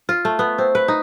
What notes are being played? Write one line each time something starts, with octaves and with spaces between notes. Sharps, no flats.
F4
A3
B3
C4
B4
D#4